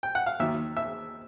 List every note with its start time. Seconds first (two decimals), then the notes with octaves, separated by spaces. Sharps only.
0.03 G5
0.15 F#5
0.26 F5
0.39 D#2 D#3 F#3 E5
0.77 E5